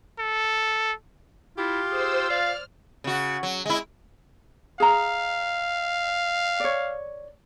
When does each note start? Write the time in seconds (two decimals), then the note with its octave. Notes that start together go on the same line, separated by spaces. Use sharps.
0.19 A4
1.58 E4 F4 G4
1.91 G#4 C5 E6
2.30 D5 F5 F6
3.04 C#3 F#4
3.43 F#3
3.66 G#3 E4
4.80 G#4 F5 A#5
6.60 C#5 D5